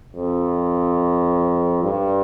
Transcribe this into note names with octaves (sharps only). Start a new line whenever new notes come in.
F2
G2